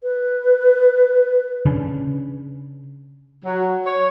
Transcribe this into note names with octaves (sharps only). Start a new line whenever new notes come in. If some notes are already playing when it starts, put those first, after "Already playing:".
B4
C#3 C#4 D4
F#3
C#5